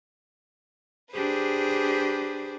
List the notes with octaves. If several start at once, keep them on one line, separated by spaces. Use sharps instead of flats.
D4 G4 G#4 B4 C5